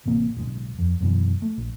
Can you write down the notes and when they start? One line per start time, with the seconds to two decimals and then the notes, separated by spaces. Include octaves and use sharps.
0.06 A1 A2 C3 A#3
0.37 D1 B1 C3 G#3
0.79 F2
1.01 F#2 B2 E3
1.42 A3
1.58 A#1